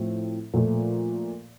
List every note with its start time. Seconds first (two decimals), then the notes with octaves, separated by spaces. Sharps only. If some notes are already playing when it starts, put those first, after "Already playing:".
Already playing: A2 F3 A3 C4
0.54 A#2 F3 A3